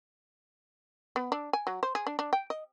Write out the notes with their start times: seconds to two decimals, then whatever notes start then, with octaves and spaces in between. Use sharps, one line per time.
1.16 B3
1.32 D4
1.53 G#5
1.67 F#3
1.83 C5
1.95 G#4
2.07 D4
2.19 D4
2.33 G5
2.50 D#5